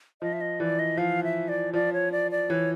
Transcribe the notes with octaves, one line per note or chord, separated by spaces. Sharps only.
F3 D#5
E5
D#5
E3 D5
D#5
F3 F5
E5
D5
F3 D5
C#5
D5
D5
E3 C#5